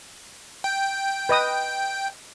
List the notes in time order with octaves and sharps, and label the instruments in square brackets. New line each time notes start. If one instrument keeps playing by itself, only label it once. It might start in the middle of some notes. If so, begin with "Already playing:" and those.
[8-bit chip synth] G5
[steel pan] B4 D#5 D#6